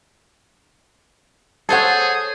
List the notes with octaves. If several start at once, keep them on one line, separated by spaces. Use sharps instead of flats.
G#4 A4 C5 C#5 F#5 A5